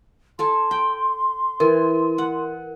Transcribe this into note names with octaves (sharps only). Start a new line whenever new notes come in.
A4 G#5 A5 C6
G5
E3 A#4
F#5